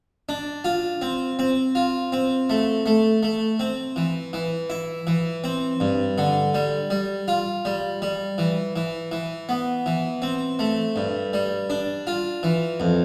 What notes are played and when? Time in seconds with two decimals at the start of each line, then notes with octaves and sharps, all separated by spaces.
0.29 D4
0.64 F4
1.02 C4
1.39 C4
1.75 F4
2.12 C4
2.50 A3
2.86 A3
3.23 A3
3.60 C4
3.96 E3
4.33 E3
4.70 E4
5.07 E3
5.44 C4
5.80 G2
6.18 D3
6.54 G3
6.90 G3
7.28 F4
7.65 G3
8.02 G3
8.38 E3
8.76 E3
9.12 E3
9.49 B3
9.86 E3
10.22 C4
10.59 A3
10.96 G2
11.33 G3
11.70 D4
12.07 F4
12.43 E3
12.80 F2